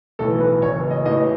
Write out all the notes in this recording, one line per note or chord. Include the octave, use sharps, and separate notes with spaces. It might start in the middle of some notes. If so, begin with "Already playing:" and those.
B1 A2 E3 A4
B4
F#1 F#2 E3 C#5
D#5
A1 A2 E3 D#5